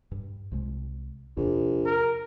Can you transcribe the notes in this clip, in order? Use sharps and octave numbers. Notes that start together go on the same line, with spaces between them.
G2
C2 C3 G#3
A#1 E2 C3
A#4